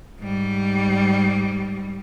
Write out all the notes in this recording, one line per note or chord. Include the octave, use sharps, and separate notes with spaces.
G#2 G3